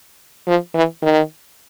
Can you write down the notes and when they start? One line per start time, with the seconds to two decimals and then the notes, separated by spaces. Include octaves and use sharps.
0.48 F3
0.75 E3
1.03 D#3